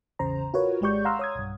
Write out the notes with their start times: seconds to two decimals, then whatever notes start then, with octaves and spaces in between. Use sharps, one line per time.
0.19 A1 E2 C#3 C5 A#5
0.54 F4 F#4 A#4 B4 C#5
0.81 G#1 G#3 G4 D5 C#6 G6
1.05 F5 F#5 A#5 C6 E6 F6
1.19 C#5 D#6 G#6
1.35 B1 G2